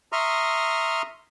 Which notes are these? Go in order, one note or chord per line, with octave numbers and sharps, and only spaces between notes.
E5 A#5 C6 C#6 D#6 F6